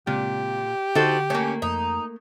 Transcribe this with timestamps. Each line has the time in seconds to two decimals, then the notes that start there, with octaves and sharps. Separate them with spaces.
0.07 A#2 C#3 G#3 C4 G4
0.95 D3 D#4 F#4 A4 C5
1.30 A3 A#3 C#4
1.62 F2 D#4